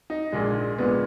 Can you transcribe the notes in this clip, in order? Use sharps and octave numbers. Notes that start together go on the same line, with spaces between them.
D#4
A#1 A#2 G#3
A#1 A#2 G#3 B3